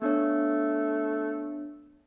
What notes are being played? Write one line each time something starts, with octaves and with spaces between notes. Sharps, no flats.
A3 B3 D4 C#5